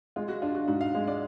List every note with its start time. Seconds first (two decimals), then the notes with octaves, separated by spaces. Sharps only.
0.16 G#3 F4
0.28 F#4
0.42 D4 F4
0.55 F#4
0.68 G#2 F#4
0.81 F5
0.94 G#3
1.08 D5